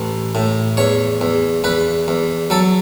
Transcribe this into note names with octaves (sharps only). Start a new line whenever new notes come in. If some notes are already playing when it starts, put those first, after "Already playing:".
Already playing: A1
A2
E2 C#5
E2
E2 B4
E2
F#3 A4